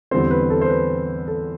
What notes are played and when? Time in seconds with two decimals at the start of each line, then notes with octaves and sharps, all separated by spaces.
0.11 E2 D3 G3 C4 C5
0.31 B4
0.50 A4
0.61 C5
0.69 B4
1.28 A4